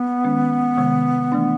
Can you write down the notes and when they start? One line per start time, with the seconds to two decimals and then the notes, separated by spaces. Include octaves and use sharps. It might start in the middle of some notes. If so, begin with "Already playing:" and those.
Already playing: B3
0.24 D#3 G#3 C#4
0.77 C3 D#3 G#3
1.32 E3 A3 D4